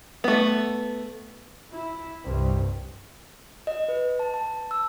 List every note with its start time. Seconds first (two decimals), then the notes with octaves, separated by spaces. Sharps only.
0.24 A3 B3
1.73 E4
2.24 C2 G2
3.67 D#5
3.89 B4
4.19 A5
4.34 A5
4.71 E6